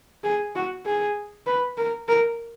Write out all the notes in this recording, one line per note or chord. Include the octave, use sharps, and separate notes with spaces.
G#4
F#4
G#4
B4
A#4
A#4